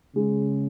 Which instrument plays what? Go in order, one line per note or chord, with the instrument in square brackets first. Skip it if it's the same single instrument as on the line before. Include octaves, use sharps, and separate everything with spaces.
[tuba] C#3 [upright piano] G#3